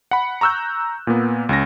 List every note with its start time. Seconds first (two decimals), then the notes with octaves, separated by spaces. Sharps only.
0.11 F#5 B5
0.41 A#5 C#6 E6 F#6 G6
1.07 A#2 A#3 B3
1.49 C#2 C#4 A#6